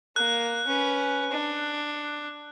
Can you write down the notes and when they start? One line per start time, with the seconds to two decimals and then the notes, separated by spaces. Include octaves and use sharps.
0.16 A#3 F#6
0.67 C#4 B4
1.31 D4